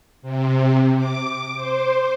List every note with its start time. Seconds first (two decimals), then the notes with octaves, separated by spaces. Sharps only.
0.22 C3
0.97 D6
1.56 C5